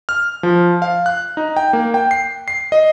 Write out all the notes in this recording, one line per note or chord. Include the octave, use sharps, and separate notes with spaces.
F6
F3
F5
F#6
D#4
G5
A#3
G5
C7
C7
D#5